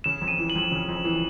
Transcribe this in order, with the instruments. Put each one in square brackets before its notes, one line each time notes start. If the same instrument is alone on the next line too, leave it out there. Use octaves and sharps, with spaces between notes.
[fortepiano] C#3 [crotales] E7
[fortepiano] F2
[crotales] D#7
[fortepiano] E3
[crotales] F#7
[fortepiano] F2
C#3
F2
E3